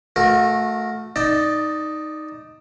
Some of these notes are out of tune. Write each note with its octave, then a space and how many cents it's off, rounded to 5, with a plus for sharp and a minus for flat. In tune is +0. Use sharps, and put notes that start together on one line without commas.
A3 -5 F#4 -35 A#4 +0
D#4 +0 D5 +15 A5 +0